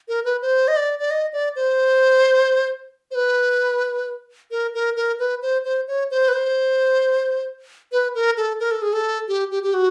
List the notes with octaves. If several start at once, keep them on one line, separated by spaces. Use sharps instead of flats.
A#4
B4
C5
D#5
D5
D5
D#5
D5
C5
C5
B4
A#4
A#4
A#4
B4
C5
C5
C#5
C5
B4
C5
B4
A#4
A4
A#4
A4
G#4
A4
G4
G4
G4
F#4